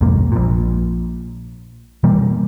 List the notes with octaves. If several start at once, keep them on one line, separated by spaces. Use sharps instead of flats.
C2 F2 G#2 A#3
A#1 A#2
B2 E3 G3 A#3